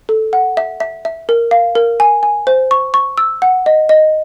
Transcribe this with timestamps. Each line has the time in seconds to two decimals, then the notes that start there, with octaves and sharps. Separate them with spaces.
0.09 A4
0.33 F#5
0.57 E5
0.80 E5
1.05 E5
1.29 A#4
1.51 F5
1.75 A#4
2.00 G#5
2.23 G#5
2.47 C5
2.71 C#6
2.94 C#6
3.18 E6
3.42 F#5
3.66 D#5
3.89 D#5